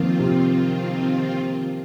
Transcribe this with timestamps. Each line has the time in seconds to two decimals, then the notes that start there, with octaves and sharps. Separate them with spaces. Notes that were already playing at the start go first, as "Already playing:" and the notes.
Already playing: D#3 F3 A#3 C4 F4
0.19 C3